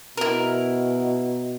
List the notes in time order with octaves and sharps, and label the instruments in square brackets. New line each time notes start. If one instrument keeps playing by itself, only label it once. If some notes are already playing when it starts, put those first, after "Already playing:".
[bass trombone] B2 [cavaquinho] E4 A#4